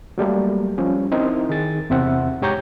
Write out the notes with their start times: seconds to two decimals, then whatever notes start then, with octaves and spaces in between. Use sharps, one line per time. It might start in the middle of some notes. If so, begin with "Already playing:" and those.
0.18 F#3 G3 A3 A#3
0.78 F3 G3 C#4
1.12 C4 D#4 E4 A#4
1.49 D#3 G#4 A6
1.90 E2 C3 C4 E5 F#5
2.42 G#2 G4 C#5 A#5 G6